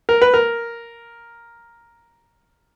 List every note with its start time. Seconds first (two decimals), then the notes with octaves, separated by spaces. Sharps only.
0.09 A#4
0.22 B4
0.34 A#4